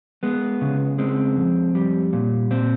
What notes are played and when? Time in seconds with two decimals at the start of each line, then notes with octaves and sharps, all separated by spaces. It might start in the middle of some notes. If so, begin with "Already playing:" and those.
0.23 G#3 B3
0.61 C#3
0.98 G#3 C4
1.37 F2
1.75 G3
2.13 A#2
2.51 A#2 C4